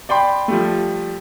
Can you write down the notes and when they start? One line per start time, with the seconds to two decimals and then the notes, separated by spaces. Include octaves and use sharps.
0.09 D5 G5 B5 C6
0.48 F3 G3 A3